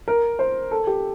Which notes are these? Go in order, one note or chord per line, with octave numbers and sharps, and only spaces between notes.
A#4
C5
A4
G4